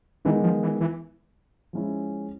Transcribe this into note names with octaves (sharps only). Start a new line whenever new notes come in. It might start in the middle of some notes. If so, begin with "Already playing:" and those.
D#3 E3 G#3 B3 D#4
F3
E3
E3
F3 G#3 C#4 E4